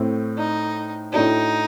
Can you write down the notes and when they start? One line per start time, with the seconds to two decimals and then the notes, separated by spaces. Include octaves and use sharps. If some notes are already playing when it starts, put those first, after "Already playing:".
Already playing: A2 A3 C4
0.38 D#4
1.13 A2 A3 D4 D#4 F#4